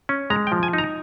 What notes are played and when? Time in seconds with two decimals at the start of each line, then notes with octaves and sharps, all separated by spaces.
0.09 C#4
0.30 G#3 A#5
0.47 G5
0.52 F3
0.63 G#5
0.73 D#4 A#5